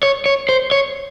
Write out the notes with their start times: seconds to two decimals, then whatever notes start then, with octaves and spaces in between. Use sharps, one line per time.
0.03 C#5
0.26 C#5
0.49 C5
0.71 C#5